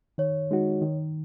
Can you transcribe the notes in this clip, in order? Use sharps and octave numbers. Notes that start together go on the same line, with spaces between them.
D#3 C#5
G#3 D#4 F#4
D#3